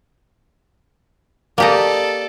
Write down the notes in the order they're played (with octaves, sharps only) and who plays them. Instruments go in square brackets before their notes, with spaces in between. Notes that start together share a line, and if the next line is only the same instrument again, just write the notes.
[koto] A#3 G4 D#5 [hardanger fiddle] A4 D5